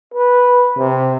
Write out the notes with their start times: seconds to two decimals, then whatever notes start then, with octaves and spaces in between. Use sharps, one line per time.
0.14 B4
0.77 C3